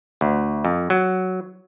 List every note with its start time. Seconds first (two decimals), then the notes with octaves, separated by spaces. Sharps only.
0.21 D2
0.65 F2
0.90 F#3